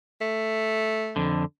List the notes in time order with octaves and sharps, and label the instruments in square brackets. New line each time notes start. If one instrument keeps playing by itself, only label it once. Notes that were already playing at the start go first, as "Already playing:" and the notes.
[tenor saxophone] A3
[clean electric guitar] F2 D3